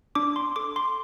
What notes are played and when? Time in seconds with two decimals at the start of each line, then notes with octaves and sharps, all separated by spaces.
0.15 D4 D6
0.36 C6
0.56 A4 D6
0.76 C6